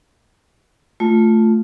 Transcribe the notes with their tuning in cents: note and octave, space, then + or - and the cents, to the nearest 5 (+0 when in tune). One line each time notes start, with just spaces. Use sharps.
A3 +0 F4 +0